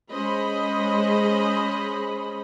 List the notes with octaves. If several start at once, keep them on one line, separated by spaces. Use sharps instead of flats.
G#3 C#4 C5 D#5 B5